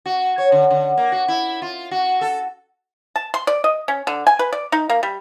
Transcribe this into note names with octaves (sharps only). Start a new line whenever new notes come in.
F#4
C#5
D3
D3
A#3
F#4
E4
F4
F#4
A4
A5
C6
D5
D#5
C#4
D3
G#5
B4
D5
D#4
A#3
G3